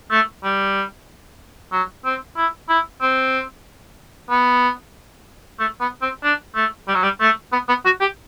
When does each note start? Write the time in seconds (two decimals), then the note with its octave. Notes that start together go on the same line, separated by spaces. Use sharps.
0.11 A3
0.44 G3
1.72 F#3
2.05 C4
2.37 E4
2.69 E4
3.01 C4
4.30 B3
5.59 A3
5.81 B3
6.02 C4
6.24 D4
6.56 A3
6.88 G3
6.95 F#3
7.03 G3
7.20 A3
7.53 B3
7.69 B3
7.85 F#4
8.01 G4